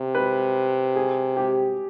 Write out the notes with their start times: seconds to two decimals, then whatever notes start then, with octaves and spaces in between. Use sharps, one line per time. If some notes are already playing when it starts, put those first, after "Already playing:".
Already playing: C3
0.15 B4
0.96 G#4
1.37 G4